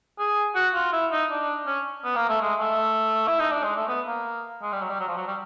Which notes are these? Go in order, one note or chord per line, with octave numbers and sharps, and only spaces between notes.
G#4
F#4
F4
E4
D#4
D4
C#4
B3
A#3
A3
G#3
A3
E4
D#4
D4
G#3
A3
B3
A#3
G#3
G3
F#3
G3
F#3
F3
F#3
G3